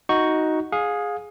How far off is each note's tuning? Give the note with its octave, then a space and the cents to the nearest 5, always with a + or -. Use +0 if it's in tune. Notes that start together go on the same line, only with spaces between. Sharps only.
D#4 +10 F#4 +0 C#6 +0
G#4 +0 F5 +30